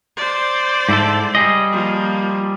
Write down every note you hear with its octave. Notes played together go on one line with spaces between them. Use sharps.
C5 D5
G#2 E4 A4
G3 G#4 D#5
F3 A#3